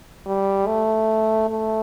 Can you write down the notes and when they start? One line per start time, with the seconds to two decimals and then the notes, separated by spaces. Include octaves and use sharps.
0.26 G3
0.67 A3
1.49 A3